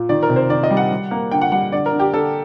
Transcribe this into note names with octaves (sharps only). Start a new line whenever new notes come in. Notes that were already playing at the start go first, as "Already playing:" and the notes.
Already playing: A#2
D#3 D5
A#4
C3
C5
D#3 D5
D#5
G3
F#5
G3
A#3
D3 G5
F#5
G3 F#5
D3 D5
A#4
D3
G4
D3 A4